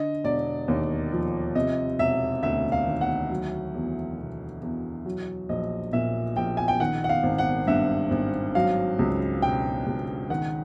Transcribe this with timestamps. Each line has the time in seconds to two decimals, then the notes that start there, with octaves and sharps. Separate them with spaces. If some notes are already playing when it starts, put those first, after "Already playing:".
Already playing: D3 D#5
0.24 E1 D5
0.68 D#2
1.12 F3
1.55 C3 D#5
1.99 E1 E5
2.42 D2 E5
2.72 F5
2.87 D#3
3.01 F#5
3.31 F#3
3.74 E2
4.18 B2
4.62 E2
5.05 F#3
5.49 A#1 D#5
5.93 A#2 E5
6.37 A#1 G5
6.57 G#5
6.68 G5
6.80 D#3 F#5
7.04 F#5
7.09 F5
7.23 G#1
7.38 F#5
7.67 G2 E5
8.11 G#1
8.55 F#3 F5
8.99 C#2
9.42 B2 G5
9.86 C#2
10.30 D#3 F#5